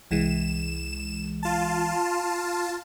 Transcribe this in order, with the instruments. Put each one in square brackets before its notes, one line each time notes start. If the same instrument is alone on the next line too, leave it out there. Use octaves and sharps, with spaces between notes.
[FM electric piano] C2 E3 G#3 [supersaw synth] E7
[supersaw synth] F4 A5